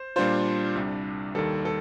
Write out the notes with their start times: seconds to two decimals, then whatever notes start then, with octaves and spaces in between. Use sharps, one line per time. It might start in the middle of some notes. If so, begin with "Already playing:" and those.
Already playing: C5
0.16 A#2 G3 D4 F4 C5
0.75 C2 C3 G3 D4
1.35 D#2 D#3 G3 A4
1.65 A4